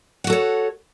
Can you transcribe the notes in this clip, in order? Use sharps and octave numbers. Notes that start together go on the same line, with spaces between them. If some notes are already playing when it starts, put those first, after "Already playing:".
F#4 A4 C#5 F#5